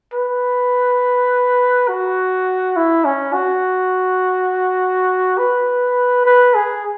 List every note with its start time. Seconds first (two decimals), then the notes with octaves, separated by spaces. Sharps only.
0.13 B4
1.88 F#4
2.76 E4
3.05 C#4
3.34 F#4
5.38 B4
6.26 B4
6.54 G#4